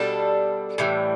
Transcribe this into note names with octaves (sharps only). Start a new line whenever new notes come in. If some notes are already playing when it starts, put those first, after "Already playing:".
Already playing: B2 G3 D4 A4
A2 E3 G3